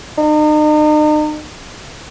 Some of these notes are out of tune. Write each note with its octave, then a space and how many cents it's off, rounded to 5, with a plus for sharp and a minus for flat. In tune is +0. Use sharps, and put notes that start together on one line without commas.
D#4 -40